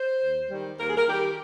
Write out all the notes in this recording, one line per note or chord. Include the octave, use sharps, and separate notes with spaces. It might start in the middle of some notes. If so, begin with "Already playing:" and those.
Already playing: C5
D#2
D#3 G3
D#2 A#4
G#4
A#4
D#3 G3 G4